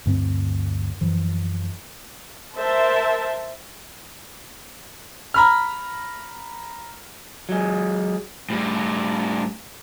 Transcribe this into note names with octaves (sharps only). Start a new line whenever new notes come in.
D2 G2 A3 C4
F#2 E3 F3
A#4 C5 E5 A5
A#5 B5 F6
F#3 G#3
A2 G3